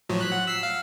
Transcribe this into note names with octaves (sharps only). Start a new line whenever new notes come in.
A2 F3 F#3
F#6 B6
F#5 F#6
E6 B6 C7
F5